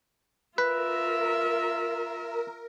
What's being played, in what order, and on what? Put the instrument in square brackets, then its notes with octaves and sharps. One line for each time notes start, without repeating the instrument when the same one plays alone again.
[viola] F4 E5 [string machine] A#4 [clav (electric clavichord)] B4